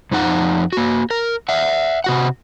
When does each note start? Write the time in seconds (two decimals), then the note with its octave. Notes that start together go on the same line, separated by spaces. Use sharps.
0.11 F2 F3 D#4 F#5
0.73 A#3 F#4
1.11 A#4
1.49 E5 F#5
2.04 C3 F#4 F#5